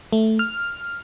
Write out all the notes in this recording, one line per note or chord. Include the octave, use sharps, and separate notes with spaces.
A3
F6